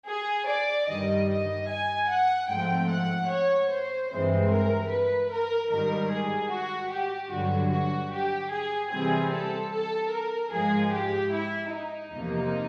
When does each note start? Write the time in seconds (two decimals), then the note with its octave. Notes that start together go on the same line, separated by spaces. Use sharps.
0.08 G#4
0.49 D5
0.89 G2 D#3 G3 D#5
1.29 D#5
1.70 G#5
2.10 F#5
2.50 G#2 F3 A3 C4 G5
2.90 F#5
3.31 C#5
3.70 C5
4.11 G2 E3 G#3 C4 C5
4.51 A#4
4.91 B4
5.31 A#4
5.71 G#2 D#3 G3 A#4
6.11 G#4
6.51 F#4
6.92 G4
7.32 G2 D3 F#3 F#4
7.72 F#4
8.12 G4
8.53 G#4
8.92 C3 E3 G3 C4 G#4
9.33 A4
9.73 A4
10.13 A#4
10.53 G#2 F3 G#3 G#4
10.93 G4
11.33 E4
11.74 D#4
12.14 E2 C3 F3 A#3